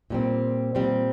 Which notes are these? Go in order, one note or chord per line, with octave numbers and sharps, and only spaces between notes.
A#2 G3 C4
A#2 G3 C4